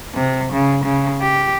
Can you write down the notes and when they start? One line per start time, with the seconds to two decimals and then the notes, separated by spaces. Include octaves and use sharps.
0.15 C3
0.53 C#3
0.84 C#3
1.21 G4